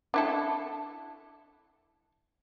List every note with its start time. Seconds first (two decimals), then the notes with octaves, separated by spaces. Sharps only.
0.14 D4 E4 A4